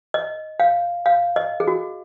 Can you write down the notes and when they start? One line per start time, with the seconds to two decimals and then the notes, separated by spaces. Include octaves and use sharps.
0.14 D#5
0.60 F5
1.06 F5
1.36 D#5
1.60 G#4
1.67 F#4